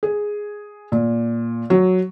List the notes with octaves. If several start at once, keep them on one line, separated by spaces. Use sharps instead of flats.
G#4
A#2
F#3